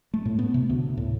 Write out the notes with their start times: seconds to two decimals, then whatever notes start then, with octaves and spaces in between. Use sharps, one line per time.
0.14 A3
0.25 A2
0.39 B3
0.54 C3
0.69 D2
0.97 A2